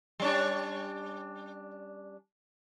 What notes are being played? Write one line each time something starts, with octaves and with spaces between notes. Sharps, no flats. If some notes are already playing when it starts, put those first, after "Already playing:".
G3 C#4 D4